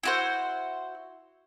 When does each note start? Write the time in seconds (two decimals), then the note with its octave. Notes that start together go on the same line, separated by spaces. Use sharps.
0.03 E4 F#4 C5